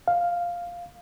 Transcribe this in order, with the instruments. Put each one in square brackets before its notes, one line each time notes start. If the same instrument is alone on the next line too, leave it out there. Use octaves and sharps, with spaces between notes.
[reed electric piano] F5